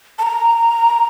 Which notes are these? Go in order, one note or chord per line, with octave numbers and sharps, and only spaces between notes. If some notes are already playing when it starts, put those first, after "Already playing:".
A5
A#5